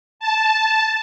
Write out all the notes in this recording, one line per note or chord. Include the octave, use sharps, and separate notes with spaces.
A5